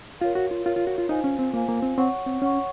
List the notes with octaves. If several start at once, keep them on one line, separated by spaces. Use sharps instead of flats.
F4 A#4 C#5 F5
F#4
F4
F4 A#4 C#5 F5
F4
F#4
F4
D#4 F4 C5 F5 G#5
C#4
C4
A#3 F4 C5 F5 G#5
A#3
C4
C4 C#5 F#5 C#6
C4
C#4 C#5 F#5 C#6